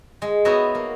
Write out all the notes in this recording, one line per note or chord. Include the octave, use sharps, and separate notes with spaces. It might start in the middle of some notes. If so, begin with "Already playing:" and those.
G#3
B3 D#4 F#4 C#5 D#5 E5
A#3